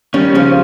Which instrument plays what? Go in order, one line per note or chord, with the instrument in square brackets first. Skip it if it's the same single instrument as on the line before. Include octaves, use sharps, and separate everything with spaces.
[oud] D#3 G3 [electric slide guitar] C#4
[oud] C#3 F3 [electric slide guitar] C#4